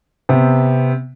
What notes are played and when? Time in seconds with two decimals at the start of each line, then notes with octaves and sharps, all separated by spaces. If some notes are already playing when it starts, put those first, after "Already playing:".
0.29 C3 B3 C4